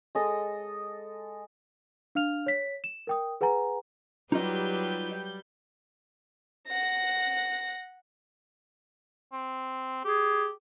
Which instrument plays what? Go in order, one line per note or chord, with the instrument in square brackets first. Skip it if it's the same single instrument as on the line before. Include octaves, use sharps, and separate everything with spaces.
[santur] G#3 A4 D#5
[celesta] D4 F5 F6 F7
C#5 B6
E7
A#4 G5 D#6
G#4 B4 F#5 G#5 A#5
[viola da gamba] F#3 G4 B4 [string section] G3 G6 [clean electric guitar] D#4 F4 D#5
[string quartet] F#5 A#6
[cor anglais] C4
[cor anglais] G4 [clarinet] G#4